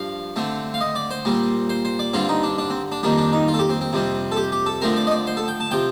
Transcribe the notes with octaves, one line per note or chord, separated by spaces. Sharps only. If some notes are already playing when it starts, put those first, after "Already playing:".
Already playing: G2 F3 F5
D3 A3 C4
F5
D#5
D5
C5
A#2 G3 C4
C5
C5
D5
G2 D3 G3 C4 F4
D#4
D4
D4
C4
D4
F2 D#3 G3 A#3 D4
D4
D#4
F4
A4
G4
C4
C4
F2 C3 G3 C4
A4
G4
G4
A4
D3 F3 A3 C4 A#4
D5
D#5
D5
C5
A4
G5
A5
C3 F3 G5